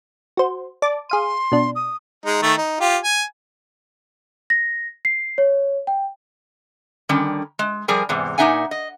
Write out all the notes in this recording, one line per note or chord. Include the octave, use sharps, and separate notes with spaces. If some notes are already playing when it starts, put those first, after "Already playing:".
F#4 C5
D5 A5 D6
G#4 F5 C6 D#7
B2 D4
D#6
G#3 D#4
D#3 A3
D#4
F4 G4
G#5
A#6
C7
C#5
G5
D3 D#3 G3 C#4
G#3
F3 G3 G#4 A#4 G#5
E2 G#2 C3
A#2 G#3 D#4 E5 F#5 G#5
D#5